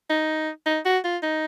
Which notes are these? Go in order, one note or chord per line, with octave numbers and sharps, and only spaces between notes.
D#4
D#4
F#4
F4
D#4